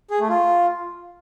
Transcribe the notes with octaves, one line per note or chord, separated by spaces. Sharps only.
G#4
A3
F4